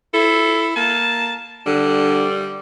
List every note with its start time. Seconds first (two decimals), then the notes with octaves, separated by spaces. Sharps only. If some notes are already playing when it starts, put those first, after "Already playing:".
0.14 E4 A4
0.76 A#3 A5
1.66 D3 G3